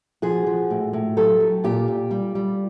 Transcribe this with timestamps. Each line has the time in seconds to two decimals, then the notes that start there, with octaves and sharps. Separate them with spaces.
0.22 F3 F#4 G#4
0.47 F3
0.70 A2
0.93 A2
1.17 F#3 G4 A4
1.40 F#3
1.64 A#2 F4 G4
1.88 A#2
2.11 G3
2.35 G3